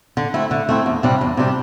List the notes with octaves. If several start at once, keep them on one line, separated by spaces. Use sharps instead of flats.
D3
A3 C4 E4
D3
A3 C4 E4
E2
C3 G3 D4
E2
C3 G3 D4